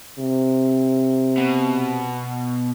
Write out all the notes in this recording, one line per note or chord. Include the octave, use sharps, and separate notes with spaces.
C3
B2